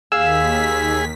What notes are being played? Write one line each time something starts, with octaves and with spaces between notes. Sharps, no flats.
D#2 G#4 F5 E6 B6